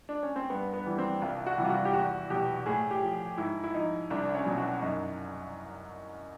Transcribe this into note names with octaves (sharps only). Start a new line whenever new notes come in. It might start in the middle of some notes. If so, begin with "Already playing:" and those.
D4
C#4
C4
G2 B3
B3
E3 G3
C4
C2 F4
F#4
C3 E3 G3
F4
F#4
G4
E2 F#4
B2 F#3 G4
A2 G#4
G4
F3
G#2 E4
E4
F3 D#4
C2 D4
C#4
B2 F#3
F#4
F#2 D#4